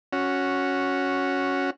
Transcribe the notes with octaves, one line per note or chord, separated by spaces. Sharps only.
C#4 F#4